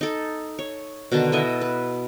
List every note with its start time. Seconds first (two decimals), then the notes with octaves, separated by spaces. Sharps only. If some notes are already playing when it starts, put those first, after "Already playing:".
0.01 D#4 A4
0.59 C#5
1.12 B2 D3 D#3 A5
1.32 E4 A4 D#5 E5
1.61 B4